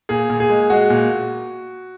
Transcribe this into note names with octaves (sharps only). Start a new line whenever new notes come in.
A#2 G#4
A#2
G#4
G#3
G#3 F#4
A#2